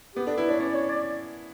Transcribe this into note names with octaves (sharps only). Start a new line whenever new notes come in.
B3 G4
D4 A4
E4 B4
D4 C#5
C#4 D5
C#5
D5